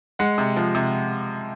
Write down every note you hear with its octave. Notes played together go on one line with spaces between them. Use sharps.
G#3 F#5
C3
F3
C3